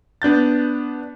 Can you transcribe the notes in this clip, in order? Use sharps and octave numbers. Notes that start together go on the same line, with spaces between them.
B3 D4 G6 A6